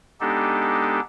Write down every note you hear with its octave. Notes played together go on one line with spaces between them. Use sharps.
G#3 B3 D4 D#4 G4 A4